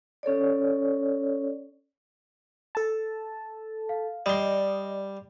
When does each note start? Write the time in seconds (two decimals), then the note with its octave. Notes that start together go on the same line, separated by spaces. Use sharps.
0.23 C#4 A4 C#5 D5
2.75 A4 A5
3.89 F5
4.26 G3 D5 D#5 C6